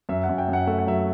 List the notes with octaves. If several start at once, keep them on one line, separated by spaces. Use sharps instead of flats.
F#2 E5
F#5
F#2
G5
F#2 F#5
A3 E5
F#5
F#3 E5